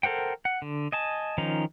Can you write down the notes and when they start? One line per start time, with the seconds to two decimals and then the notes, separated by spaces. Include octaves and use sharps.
0.03 A4 A#4 C5 F#5 G5
0.45 F#5
0.62 D3
0.92 D#5 G#5 A5
1.38 D#3 F3 C#4 D#4